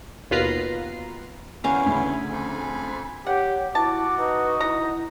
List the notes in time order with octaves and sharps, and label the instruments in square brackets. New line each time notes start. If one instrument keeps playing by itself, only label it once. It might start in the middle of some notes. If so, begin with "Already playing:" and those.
[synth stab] D#2 B2 F4 B4 A#5 C7
[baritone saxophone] E2 [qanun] C#4 F5 [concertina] F#4 A#4
[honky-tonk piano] D2 C#3 [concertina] G#5 B5
[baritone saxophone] F2
[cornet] G4 [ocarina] C#5 [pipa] F#5
[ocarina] E4 [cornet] F#4 [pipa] A5 [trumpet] D6
[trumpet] D#4 [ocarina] B4
[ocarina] E4 [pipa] F#5 A#5